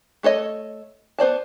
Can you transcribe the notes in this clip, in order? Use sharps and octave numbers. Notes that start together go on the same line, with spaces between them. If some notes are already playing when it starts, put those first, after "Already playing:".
A3 A4 C#5 D#5
B3 C5 D5 A5